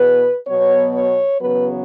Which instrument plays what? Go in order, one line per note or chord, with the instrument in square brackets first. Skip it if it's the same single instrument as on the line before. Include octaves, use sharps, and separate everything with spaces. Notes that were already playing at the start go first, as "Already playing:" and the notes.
Already playing: [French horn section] E2 B2 B3 B4
B2 F#3 B3 C#5
C#5
E2 C#3 F#3 B3 B4